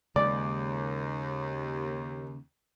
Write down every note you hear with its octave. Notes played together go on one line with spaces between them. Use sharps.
D#2 C#3 G#3 D5